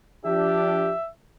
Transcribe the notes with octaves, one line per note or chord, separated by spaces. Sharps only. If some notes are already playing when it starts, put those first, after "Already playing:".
F3 D4 G4 E5